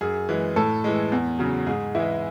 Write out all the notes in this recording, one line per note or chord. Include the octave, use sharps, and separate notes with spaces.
F#2 G#4
E3 G#3
A2 A4
E3 G#3
E2
C#3 F#3
G#2 G#4
E3 G#3 E4